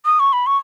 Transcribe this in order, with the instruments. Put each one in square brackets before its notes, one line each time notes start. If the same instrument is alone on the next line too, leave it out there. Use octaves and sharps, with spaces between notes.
[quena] D#6
C#6
B5
C#6